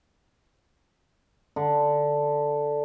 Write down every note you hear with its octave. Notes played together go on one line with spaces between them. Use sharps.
D3